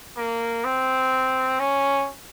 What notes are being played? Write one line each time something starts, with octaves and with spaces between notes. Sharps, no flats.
A#3
C4
C#4